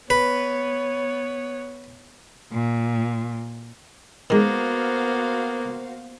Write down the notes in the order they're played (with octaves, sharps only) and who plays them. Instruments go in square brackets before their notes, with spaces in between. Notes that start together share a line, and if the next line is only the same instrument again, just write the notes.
[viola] B3 C#5 [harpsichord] B4
[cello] A#2
[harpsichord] D#3 G#3 [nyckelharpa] A#3 B3 [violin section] F#4 C5 F5